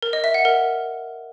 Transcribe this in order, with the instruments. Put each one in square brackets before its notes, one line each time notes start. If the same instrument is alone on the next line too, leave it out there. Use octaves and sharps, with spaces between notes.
[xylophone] A#4
D#5
E5
F#5
A#4